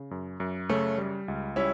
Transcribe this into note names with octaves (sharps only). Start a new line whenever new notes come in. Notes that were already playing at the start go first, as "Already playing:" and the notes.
Already playing: C#3
F#2
F#2
C#3 A3 C#4
G3
C#2
G3 C#4 E4